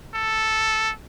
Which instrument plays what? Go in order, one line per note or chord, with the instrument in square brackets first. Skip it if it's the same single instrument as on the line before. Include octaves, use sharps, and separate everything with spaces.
[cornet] A4